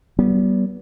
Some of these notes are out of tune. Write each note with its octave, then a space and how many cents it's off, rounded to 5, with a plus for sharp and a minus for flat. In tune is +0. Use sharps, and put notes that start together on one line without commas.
G3 -40 B3 -25